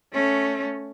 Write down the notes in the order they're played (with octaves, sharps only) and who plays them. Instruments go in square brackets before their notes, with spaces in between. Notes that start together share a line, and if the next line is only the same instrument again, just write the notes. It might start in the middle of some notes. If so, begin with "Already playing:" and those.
[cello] A3 C#4